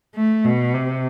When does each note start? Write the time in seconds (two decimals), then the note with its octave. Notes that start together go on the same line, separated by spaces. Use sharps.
0.15 A3
0.45 B2
0.74 C3